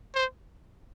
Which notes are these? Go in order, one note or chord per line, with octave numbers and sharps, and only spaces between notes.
C5